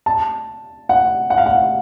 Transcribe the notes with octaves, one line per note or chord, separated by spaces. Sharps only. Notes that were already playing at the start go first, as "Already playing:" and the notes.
A5
F#5
F#5
F5
F#5